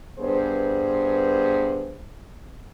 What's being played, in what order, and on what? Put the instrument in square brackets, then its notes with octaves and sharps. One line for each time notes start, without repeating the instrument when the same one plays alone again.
[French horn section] G2 B3 G#4 C5